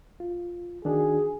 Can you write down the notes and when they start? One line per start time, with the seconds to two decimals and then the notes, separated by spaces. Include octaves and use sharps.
0.20 F4
0.85 D#3 D4 F#4 G#4